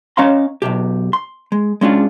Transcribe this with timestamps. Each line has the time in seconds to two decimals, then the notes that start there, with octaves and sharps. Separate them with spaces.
0.17 C#4 C#5 D#5 F5 A#5 C6
0.62 B1 G2 B2 G4
1.13 C6
1.52 G#3
1.81 G#3 C#4 D4 F4